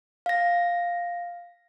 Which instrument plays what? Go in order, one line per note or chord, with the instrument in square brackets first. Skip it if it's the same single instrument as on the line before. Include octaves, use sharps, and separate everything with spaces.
[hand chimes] F5 A#6